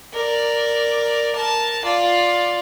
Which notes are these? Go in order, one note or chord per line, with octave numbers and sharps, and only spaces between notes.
A#4 D5
A#4 A5
F4 D5